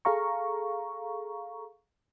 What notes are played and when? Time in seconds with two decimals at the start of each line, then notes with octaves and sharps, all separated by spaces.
0.05 G#4 A4 F5 A#5 C#6